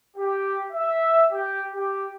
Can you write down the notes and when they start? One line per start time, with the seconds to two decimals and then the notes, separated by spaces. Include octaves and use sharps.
0.17 G4
0.72 E5
1.31 G4
1.74 G4